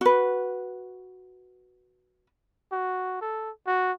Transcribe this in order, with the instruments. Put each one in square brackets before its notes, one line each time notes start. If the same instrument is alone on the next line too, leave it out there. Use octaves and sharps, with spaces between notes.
[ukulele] F#4 B4
[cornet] F#4
A4
F#4